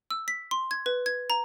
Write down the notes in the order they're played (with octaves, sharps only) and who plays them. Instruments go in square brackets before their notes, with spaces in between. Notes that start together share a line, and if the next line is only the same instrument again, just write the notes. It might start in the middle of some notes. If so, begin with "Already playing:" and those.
[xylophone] E6
B6
C6
G#6
B4
G#6
A#5